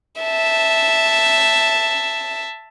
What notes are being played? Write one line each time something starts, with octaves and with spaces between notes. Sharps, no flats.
E5 A5